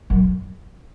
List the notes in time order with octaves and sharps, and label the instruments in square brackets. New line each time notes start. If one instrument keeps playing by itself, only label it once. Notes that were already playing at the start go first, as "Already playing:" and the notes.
[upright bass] F#2